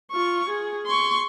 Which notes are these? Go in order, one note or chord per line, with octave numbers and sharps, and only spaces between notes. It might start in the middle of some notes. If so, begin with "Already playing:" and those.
F4 C#6
G#4
C6 C#6